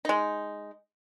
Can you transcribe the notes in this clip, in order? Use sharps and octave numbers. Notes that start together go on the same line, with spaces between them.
G#3 D#4